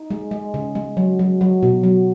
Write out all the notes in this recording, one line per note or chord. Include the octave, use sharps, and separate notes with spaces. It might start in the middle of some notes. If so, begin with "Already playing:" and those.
Already playing: D#4
G#3
G#3
C#3
G#3
F#3
F#3
F#3
B2
F#3